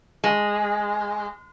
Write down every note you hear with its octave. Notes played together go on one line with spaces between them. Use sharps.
G#3